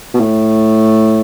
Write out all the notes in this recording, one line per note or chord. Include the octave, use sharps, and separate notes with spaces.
B2
A2